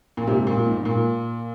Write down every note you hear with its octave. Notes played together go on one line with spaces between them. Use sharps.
A#2
G#2 C3
A#2
G#2
G#2
A#2